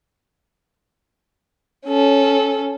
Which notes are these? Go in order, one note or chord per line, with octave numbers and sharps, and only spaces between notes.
C#4 A4